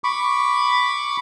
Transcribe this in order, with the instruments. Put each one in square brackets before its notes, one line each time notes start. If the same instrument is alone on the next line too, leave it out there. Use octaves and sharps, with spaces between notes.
[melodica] B5 C#6 D6